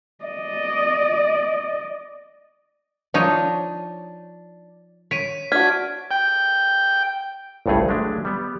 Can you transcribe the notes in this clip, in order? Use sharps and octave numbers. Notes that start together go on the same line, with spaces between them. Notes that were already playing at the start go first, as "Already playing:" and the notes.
D5 D#5
F3 D4 D#4 C#5
C#5 B6 D7 D#7
D4 F#4 F6 G#6 B6
G5
G1 C2 G2 A3 G#4 C#5
F#3 G#3 A3 D4 G4
G3 B3